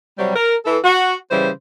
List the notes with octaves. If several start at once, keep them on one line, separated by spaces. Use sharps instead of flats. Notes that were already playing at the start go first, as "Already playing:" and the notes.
C3 F#3 G3
A#4
E3 A4
F#4
C#3 E3 G3 C5